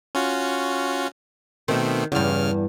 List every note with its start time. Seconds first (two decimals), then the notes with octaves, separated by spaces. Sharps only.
0.15 C#4 F4 F#4
1.68 B2 D#3 A3 C4
2.12 E2 G2 C#3 F6